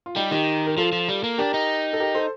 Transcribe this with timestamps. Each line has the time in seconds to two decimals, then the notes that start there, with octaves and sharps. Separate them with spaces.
0.06 F4
0.16 G3 D#4 G4
0.31 D#3 D#4 G4
0.67 A#4
0.77 F3 F4 A4
0.92 F3
1.09 G3
1.24 A#3
1.38 D4 G4 A#4
1.54 D#4
1.93 A4
2.00 G4 A#4
2.15 A4 C5